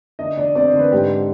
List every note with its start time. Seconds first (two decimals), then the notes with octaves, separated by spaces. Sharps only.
0.19 D3 D#5
0.37 D3 D5
0.55 C4 D5
0.68 C5
0.74 D3
0.79 B4
0.92 G#2 G4